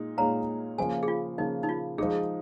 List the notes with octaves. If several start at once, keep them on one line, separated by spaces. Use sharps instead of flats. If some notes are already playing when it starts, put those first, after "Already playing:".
Already playing: A#2 G#3 D#4
A#2 G#3 D#4 C#5 F5 A#5
C#3 F3 A#3 G#5
G#4
F4
C#3 F3 A#3 D#4
D#4
F4
F3 G#3 D#4 G#4